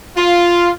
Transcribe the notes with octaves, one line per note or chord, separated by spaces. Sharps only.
F4